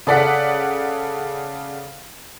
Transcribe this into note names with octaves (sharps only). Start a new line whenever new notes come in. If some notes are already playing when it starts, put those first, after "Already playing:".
C#3 A4 D5 F#5 B6